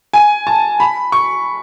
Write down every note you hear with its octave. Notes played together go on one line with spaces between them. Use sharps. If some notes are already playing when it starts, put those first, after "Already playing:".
G#5
A5
B5
C#6